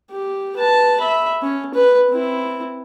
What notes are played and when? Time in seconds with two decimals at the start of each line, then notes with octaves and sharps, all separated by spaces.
0.11 G4
0.57 B4 A5
1.00 E5 B5
1.42 C#4
1.74 B4
2.10 C4 E4